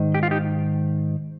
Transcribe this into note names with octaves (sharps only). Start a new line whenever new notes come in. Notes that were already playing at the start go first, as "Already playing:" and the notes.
Already playing: G#2 D#3
G4
F4
D#4 G4